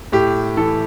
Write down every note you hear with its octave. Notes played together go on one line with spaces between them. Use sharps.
A2 G4
E3 A4